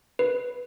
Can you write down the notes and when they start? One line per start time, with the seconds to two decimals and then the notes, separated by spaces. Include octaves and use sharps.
0.19 B4